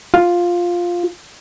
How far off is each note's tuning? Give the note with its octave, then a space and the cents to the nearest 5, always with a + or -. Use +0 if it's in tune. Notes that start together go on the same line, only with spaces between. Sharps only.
F4 +5